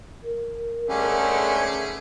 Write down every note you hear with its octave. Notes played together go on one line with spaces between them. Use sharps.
A#4
G#2 D3 G3 A3 C#4 G#4